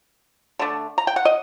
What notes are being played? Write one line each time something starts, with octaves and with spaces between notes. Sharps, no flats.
D3 A3 D4
A#5
G5
F#5
D#5